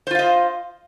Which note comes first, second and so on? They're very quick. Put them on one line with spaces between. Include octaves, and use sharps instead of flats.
C5 F4 F5 D#5